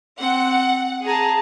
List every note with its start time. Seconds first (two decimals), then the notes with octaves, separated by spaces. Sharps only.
0.20 C4 F#5
1.05 G#4 A5 A#5